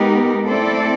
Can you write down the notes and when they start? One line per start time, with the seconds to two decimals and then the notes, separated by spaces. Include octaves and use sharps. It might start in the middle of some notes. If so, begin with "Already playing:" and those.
Already playing: G#3 B3 D#4 G4 A#4
0.45 A3 C4 E4 A4 D5